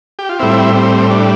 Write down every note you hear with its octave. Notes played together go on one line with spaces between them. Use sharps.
G4
F4
A2 G3 C4 E4
C4
D4